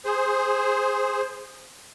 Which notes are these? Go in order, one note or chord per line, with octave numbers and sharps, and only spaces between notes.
G#4 C5